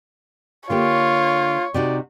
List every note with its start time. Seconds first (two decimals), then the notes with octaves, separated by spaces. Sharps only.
0.70 D3 A#3 F4 G4 C#5
1.74 C3 D#4 F#4 D5